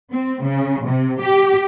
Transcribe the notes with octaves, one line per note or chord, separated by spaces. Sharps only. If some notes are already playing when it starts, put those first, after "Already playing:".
C4
C#3
C3
G4